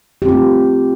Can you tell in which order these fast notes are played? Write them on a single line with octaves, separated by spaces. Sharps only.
G4 C4 F4 A3